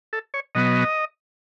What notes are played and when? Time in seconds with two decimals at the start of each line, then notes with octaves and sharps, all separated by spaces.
0.13 A4
0.34 C#5
0.55 B2 F#3 B3 D#5